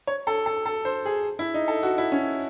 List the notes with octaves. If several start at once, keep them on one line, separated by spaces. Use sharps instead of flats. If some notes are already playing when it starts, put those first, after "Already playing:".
C#5
A4
A4
A4
C5
G#4
E4
D#4
A4
F#4
E4
C#4